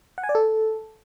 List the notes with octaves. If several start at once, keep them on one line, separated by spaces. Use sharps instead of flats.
F#5
G#5
D5
A4